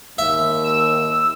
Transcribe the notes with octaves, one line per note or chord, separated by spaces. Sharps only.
D#2 E5
E6